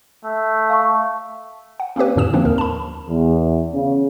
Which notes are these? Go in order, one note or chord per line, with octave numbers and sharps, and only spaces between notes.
A3
F5 A5 C#6
F#5
A#3 C4 C#4 G4 B4
F2 A2 D3 C#4 D#6 E7
F3 A#3 C4 D4
D#2 A#4
A5 B5
E2
C#3